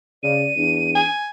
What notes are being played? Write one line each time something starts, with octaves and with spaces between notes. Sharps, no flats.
C#3 D5 D#7
E2 D4
G#5